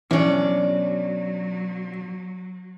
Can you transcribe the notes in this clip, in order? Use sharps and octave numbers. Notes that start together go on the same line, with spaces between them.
B2 E3 F#3 C#4 D4 C#5 D5